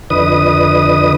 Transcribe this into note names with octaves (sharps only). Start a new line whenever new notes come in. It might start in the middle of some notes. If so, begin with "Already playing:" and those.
F2 D3 B4 D#5 D#6